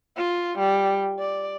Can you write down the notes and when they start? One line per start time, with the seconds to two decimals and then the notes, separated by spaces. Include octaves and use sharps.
0.17 F4
0.58 G3
1.20 D5